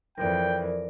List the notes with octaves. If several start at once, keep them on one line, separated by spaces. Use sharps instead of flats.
F2 E3 A#4 D5 G5